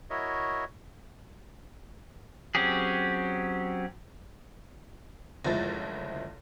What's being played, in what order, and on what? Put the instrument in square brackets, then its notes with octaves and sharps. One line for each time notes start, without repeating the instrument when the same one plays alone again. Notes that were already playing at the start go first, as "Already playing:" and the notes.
[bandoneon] E4 F#4 A#4 C#5 D#5 E5
[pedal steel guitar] F#3 C4 C#4 G4 G#4
[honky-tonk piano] F#1 D2 F3 G#3 E4 A6